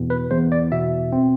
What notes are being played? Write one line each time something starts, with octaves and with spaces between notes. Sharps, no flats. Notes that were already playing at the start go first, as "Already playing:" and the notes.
Already playing: E2 B2
B4
E2 C5
D5
B2 E5
C4